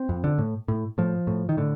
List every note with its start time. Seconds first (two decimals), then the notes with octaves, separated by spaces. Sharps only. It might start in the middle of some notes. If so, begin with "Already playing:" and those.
Already playing: C4
0.09 F2
0.24 D3
0.38 A2
0.68 A2
0.98 A2 F3
1.27 A2
1.49 D#3
1.57 A2 D3